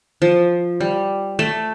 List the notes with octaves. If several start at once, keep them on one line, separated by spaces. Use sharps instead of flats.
F3
G3
A3